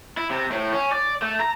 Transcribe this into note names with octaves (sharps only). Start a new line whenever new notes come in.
E4
C3
A2
C#4
D5
A3
A#5